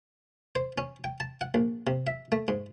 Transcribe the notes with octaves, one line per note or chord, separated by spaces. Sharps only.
C5
C#4
G5
A5
F#5
A#1
C3
E5
A3
G#2